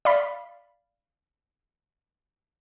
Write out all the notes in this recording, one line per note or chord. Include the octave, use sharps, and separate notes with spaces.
D5 F5 B5